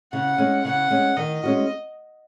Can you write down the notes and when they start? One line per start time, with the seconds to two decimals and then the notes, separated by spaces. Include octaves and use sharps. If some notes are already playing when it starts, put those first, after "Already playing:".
0.13 C#3 F#5
0.38 G#3 C#4
0.65 C#3 F#5
0.90 G#3 C#4
1.17 D#3 D#5
1.44 G#3 C#4 F#4